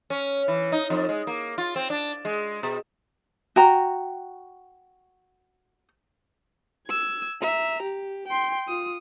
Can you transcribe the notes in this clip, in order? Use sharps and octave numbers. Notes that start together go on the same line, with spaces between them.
C#4
E3
D#4
F2
G#3
A#3
F4
C4
D4
G#3
B2
F#4 G5 A#5
E6 G#6
E5 A#5
G4
G5 C6
F4 D#6